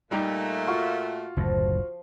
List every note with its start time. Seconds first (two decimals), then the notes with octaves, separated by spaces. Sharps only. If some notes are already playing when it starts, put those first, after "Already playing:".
0.11 A#2 G3 A3 D#4 G4
0.67 F4 F#4 C#6
1.37 F#1 D2 A2 F3